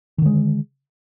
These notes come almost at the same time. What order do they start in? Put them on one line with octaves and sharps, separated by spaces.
D#3 D3 G#3